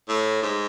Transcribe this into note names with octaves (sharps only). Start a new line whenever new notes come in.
A2
G#2